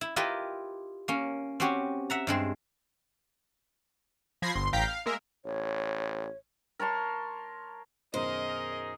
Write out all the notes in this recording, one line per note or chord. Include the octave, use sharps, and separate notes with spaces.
E4
E4 F4 G4 A#4 B4 D#5
A#3 C#4
C4 C#4 F#4 G4 C#5
E5 F#5 A#5
G2 G#3 C4
F3 B5 G#6 A#6 C7
G1 C6
A1 F5 G5 A#5 G6 B6
F5
G#3 A#3 A#4 E5
A1 C#5
A#4 C#5 A5 C6
F#2 B2 D#3 D#4 G#4 A#4 C5 D#5